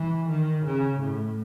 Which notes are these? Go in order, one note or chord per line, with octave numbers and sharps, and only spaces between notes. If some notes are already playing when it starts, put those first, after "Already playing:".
Already playing: E3
D#3
C#3
A2